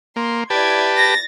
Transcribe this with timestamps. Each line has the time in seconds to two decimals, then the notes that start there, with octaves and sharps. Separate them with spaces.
0.16 A#3 C6
0.50 E4 G4 B4 D5 A5 G#6
0.96 A6 A#6